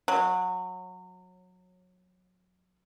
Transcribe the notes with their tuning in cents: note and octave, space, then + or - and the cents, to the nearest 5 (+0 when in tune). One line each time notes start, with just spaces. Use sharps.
F#3 -20